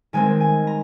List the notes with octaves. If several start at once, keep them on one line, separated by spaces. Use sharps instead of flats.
D#3 G#3 C4 G#5
G#5
A#5